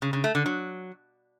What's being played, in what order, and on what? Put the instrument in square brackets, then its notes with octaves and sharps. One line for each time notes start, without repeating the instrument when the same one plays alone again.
[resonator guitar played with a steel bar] C#3
C#3
A3
D3
F#3